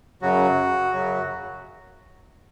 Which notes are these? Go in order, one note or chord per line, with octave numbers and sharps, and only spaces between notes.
F#2 C#3 F#3 F#4
F#2 C#3 F#3